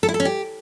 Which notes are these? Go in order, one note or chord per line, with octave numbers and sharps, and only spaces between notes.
A4
E4
A4
C#4
G4